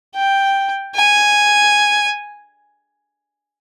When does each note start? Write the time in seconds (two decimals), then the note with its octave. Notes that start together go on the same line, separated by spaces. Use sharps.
0.15 G5
0.95 G#5